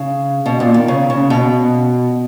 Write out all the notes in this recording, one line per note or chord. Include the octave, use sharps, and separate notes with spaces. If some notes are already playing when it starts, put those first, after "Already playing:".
Already playing: C#3
B2
A#2
D#3
C#3
C#3
B2